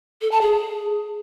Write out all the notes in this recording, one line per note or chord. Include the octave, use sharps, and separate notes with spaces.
A4
A5
G#4